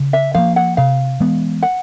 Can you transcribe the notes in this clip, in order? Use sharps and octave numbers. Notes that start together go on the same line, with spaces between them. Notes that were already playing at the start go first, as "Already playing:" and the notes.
Already playing: C#3
E5
F3 A#3 F5
F#5
C3 F5
E3 G#3 B3
F#5